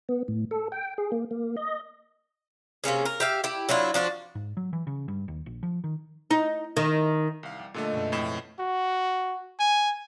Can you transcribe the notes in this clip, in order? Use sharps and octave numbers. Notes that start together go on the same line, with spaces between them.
B3
A2
A4
G5
G#4
A#3
A#3
D#5
C3 A#3 C#4 G#4
A#4
G4 E5 F5
E4 G4
F#3 D4 E4 F4
F3 D4 F4 F#4
G#2
F#3
E3
C#3
G2
D#2
A#1
F3
D#3
D#4
D#3
C2 F5
G3
A#2 D3 A3 A4 D#5 E5
F#2 B2 G#3
F2 A2 E7
F#4
G#5